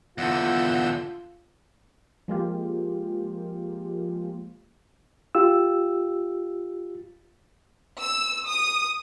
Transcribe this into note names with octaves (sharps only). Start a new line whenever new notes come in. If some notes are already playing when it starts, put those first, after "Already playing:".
E2 D3 F4 F#5 E6 G6
F3 G#3 A#3 F4 G4
F4 G4 E6
E6
D#6